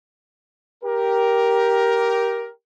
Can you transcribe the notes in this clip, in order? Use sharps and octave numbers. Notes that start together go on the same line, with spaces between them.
G4 A#4